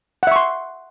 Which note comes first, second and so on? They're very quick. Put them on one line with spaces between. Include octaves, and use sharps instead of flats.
F#5 E5 C#6 C6